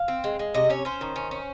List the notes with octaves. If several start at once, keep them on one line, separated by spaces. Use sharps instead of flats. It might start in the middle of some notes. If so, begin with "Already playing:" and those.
Already playing: F5
C4
G#3
G#3
C3 D#5
C#4 C#5
C#4 C5
D#3
C#4
C#4